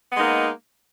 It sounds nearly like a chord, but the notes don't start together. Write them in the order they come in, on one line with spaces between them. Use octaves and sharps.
B3 G#3 D#4 A#3